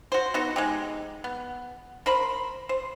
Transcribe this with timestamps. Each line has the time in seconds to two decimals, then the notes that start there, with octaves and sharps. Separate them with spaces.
0.12 F#4 C5
0.34 B3 D#4 F#4
0.56 G#3 D#4 G4
1.24 B3
2.06 A#4 C5 B5
2.69 C5